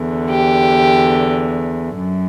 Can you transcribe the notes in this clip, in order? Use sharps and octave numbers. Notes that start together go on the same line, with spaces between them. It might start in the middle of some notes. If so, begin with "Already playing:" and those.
Already playing: E2 D3
G4
F#2